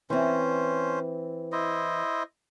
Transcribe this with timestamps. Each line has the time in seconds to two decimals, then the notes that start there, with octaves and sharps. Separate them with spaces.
0.10 E3 C4 C#4 C5
1.52 E4 C5 D#5